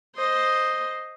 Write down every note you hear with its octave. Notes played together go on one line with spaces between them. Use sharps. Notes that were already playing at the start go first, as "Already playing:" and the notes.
C5 D#5